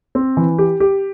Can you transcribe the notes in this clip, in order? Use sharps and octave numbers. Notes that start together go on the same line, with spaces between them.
C4
E3
G4
G4